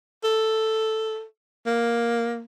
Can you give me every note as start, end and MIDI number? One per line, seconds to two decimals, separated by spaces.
0.23 1.24 69
1.66 2.44 58